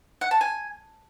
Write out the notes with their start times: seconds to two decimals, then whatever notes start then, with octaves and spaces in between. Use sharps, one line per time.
0.21 F#5
0.31 A5
0.41 G#5